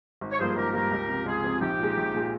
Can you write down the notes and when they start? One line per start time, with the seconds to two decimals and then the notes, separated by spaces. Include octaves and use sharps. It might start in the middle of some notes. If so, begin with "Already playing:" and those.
0.21 G#1
0.31 C#5
0.38 G2 F3 A#3 G#4 C5
0.56 G#1 G4 A#4
0.73 G2 F3 A#3 G4 A#4
0.91 C#2
1.08 C3 F3
1.26 C#2 F4 G#4
1.44 C3 F3
1.61 A#1 D#4 G4
1.79 A#2 G#3
1.97 A#1
2.14 A#2 G#3